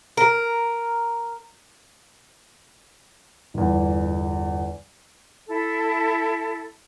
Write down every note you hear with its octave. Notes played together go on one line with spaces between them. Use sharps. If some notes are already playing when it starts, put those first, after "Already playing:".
A#4
G1 E2
E4 A4